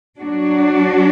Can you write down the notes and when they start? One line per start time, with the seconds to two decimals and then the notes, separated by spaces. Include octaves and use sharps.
0.17 F#3 D4 F#4